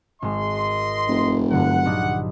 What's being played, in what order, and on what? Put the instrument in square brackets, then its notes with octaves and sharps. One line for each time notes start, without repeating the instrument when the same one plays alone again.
[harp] G#1 G#3 [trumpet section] D#5 C6
[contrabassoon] F1
[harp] G2 D3 F#3 [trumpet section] F#5
[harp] A#1 D4 D#4